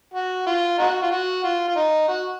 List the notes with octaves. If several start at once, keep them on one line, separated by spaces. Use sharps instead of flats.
F#4
F4
D#4 F#4
F4
F#4
F4
F4
D#4
F#4